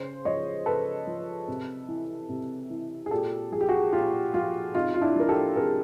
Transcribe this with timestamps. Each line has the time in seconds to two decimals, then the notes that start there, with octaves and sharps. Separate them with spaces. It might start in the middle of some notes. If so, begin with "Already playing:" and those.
Already playing: C#3 C5
0.25 F3 C#5 D#5
0.66 C#3 A4 B4
1.07 F3
1.48 C3
1.88 E3
2.29 C3
2.70 E3
3.06 G#4
3.11 A#2 G4 A4
3.52 F3 G#4
3.61 G4
3.69 F#4 G#4
3.93 A#2 F4 G4
4.34 F3 F4 G4
4.75 C3 D#4 F4
4.94 F4
5.01 D4 E4
5.16 F3 A#4
5.29 G4 A4
5.56 C3 G#4 A#4